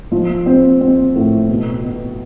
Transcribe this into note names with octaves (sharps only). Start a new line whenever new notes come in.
F3
C4
C4
A2
B2
B2